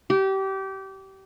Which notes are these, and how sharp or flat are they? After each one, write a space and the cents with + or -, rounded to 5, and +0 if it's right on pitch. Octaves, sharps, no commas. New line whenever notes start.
G4 -25